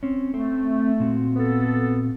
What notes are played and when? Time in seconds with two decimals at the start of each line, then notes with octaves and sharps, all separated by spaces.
0.03 C4 C#4
0.34 A3 C4
1.00 A#2 C4 F#4
1.35 B3 A4